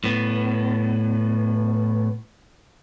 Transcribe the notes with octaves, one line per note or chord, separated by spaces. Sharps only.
A2 B3